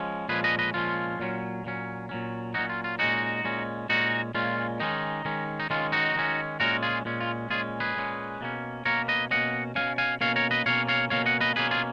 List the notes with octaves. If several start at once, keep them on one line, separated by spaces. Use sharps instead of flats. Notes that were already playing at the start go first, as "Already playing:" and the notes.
Already playing: F3 G#3 C#4
A#2 F3 G#3 C#4 G#4 B4
B4 D#5
B4 D#5
A#2 F3 G#3 C#4 F4
A#2 F#3 C#4
A#2 F#3 C#4
A#2 F#3 C#4
A#2 F#3 C#4 D#4 F#4
F4
F4
A#2 G#3 C#4 D#4 F#4
A#2 G#3 C#4
A#2 G#3 C#4 D#4 F#4
A#2 G#3 C#4 F4
D#3 G#3 C#4 D#4
D#3 G#3 C#4
D#4
D#3 G#3 C#4 F4
D#4 F#4
D#3 G#3 C#4
A#2 G#3 C#4 F#4 A#4
F4 G#4
A#2 G#3 C#4
F4
A#2 G#3 C#4 F4 G#4
G#4 B4
A#2 G#3 C#4
B2 A#3 C#4
B2 A#3 C#4 A#4 C#5
B4 D#5
B2 A#3 C#4 D#5 F#5
B2 A#3 C#4 F5 G#5
F5 G#5
B2 A#3 C#4 C#5 F5
A#4 C#5
B4 D#5
B2 A#3 C#4 C#5 F5
C#5 F5
B2 A#3 C#4 C#5 F5
D#5 F#5
B4 D#5
B2 A#3 C#4 G#4 B4
F4 G#4